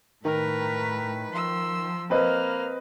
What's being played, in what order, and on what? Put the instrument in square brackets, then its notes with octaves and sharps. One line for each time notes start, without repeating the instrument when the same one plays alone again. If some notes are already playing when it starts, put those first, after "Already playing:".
[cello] A2 B4 [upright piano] D#3 [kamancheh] A#4
[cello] F3 [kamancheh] C6 E6
[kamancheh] A#3 F6 [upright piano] C4 B4 D#5